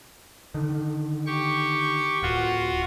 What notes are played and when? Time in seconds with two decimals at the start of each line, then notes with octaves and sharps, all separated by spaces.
0.54 D3 D#3
1.26 G4 C#6
2.23 D1 F4 F#4